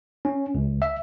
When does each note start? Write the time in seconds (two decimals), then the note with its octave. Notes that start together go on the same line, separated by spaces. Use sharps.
0.25 C#4
0.55 C#2
0.82 E5